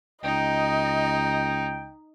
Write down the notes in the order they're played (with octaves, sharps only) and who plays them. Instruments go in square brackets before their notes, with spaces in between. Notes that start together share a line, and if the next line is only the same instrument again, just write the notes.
[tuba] C#2 [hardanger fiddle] D#4 [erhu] D#5 [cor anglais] G5